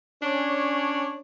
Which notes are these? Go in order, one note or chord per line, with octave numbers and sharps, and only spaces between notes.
C#4 D4 C#5